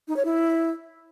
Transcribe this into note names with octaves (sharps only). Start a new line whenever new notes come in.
D#4
C#5
E4